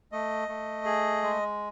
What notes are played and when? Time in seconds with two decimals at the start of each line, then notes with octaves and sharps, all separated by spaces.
0.12 A3 D#5
0.48 A3
0.85 G#4
1.23 G#3